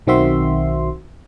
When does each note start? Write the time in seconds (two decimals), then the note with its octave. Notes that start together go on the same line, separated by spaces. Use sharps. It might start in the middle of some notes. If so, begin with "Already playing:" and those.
0.07 B1 D#3 C4 F#4 E5 C6